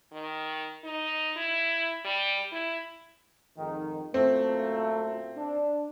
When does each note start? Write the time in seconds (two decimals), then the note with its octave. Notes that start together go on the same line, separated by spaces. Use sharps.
0.12 D#3
0.84 D#4
1.36 E4
2.04 G3
2.52 E4
3.58 F2 G#2 D#3
4.14 F#2 A#2 A3 C4
5.38 D4